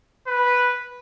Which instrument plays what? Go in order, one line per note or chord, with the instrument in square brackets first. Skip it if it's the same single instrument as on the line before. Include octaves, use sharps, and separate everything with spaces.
[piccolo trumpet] B4